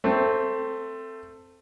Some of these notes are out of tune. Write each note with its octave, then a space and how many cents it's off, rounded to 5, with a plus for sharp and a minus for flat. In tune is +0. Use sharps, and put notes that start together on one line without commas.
A3 +15 C4 +0